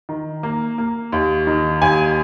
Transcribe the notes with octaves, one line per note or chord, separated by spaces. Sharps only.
D#3
A#3
A#3
D#2
D#3
D#2 G#5